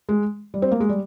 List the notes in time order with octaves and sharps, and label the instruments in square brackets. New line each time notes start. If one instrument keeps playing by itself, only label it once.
[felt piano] G#3
G3
C4
A#3
G#3
G3